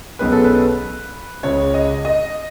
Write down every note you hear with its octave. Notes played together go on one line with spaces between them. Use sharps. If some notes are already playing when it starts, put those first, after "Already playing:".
B1 B2 G#3 C#4 B4
A4
B4
C#2 C#3 G#3 C#5
D#5
D#5